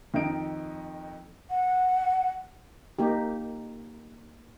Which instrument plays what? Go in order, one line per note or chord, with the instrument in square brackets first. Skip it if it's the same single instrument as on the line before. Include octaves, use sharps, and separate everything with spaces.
[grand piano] F2 D#3 D#4 D#5 D7
[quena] F#5
[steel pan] A#3 D#4 G4